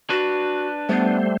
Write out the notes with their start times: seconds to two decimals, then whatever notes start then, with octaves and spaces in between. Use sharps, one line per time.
0.10 D4 F#4 B4
0.89 G3 A3 B3 C5